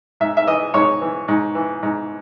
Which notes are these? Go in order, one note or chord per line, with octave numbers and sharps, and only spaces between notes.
G#2 E5
E5
E3 D#5
G#2 C#5
E3
G#2
E3
G#2